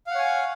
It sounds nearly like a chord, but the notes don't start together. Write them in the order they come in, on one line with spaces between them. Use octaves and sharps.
F5 F#5 C#5 G#5